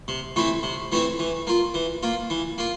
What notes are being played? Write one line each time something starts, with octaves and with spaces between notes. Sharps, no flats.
C3
E3 A3 C4 E4
C3
E3 A3 C4 E4
E3
A#3 F4
E3
A#3 F4
E3
A#3 F4